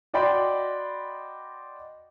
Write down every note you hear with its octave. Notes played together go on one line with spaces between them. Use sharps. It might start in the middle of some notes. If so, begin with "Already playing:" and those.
F#4 D5 D#5 G5 B5 C6